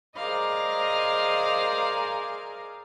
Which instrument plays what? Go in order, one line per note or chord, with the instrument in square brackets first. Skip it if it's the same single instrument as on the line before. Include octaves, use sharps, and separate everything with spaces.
[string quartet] G#4 A#4 C5 D5 D#5 F5